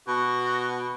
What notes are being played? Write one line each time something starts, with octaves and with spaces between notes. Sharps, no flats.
B2 F#4